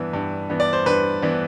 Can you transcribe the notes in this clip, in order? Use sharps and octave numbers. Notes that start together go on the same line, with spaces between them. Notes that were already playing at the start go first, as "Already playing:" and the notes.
Already playing: G2 E3 B3 D4
G2
E3 B3 D4
D5
C5
G2 B4
E3 B3 D4